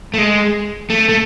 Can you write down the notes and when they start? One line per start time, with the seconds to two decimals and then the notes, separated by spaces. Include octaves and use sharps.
0.14 A3
0.18 G#3
0.90 A3
1.09 A3